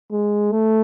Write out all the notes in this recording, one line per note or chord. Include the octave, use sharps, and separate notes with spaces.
G#3
A3